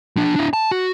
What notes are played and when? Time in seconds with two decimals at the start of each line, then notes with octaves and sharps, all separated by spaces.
0.16 F3 D4
0.35 D4 E4
0.53 A5
0.71 F#4